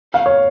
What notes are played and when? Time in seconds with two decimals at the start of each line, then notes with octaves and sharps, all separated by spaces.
0.14 F5
0.26 C#5